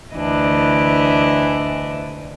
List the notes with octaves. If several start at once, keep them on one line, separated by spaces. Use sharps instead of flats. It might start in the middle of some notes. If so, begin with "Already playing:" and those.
D2 E3 D4 D#5